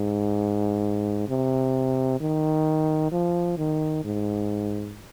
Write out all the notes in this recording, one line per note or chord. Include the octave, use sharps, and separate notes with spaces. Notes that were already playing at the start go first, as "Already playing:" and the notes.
Already playing: G#2
C3
D#3
F3
D#3
G#2